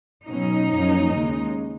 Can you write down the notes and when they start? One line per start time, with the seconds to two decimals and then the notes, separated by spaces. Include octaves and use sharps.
0.29 B2 F#3 C#4 D#4
0.71 F#2 F3 A#3 C#4
1.13 D#2 C#3 G#3